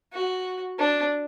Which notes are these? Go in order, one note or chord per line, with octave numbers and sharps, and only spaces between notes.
F#4
D4